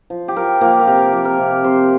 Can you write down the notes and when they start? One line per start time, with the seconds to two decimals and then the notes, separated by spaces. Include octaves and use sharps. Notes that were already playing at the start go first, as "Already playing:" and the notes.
0.10 F3
0.28 G4
0.36 F3 A#4
0.61 F3 A#3
0.79 A#4
0.87 C3 G4
1.13 F3
1.25 A#4
1.38 C3
1.63 C3 C5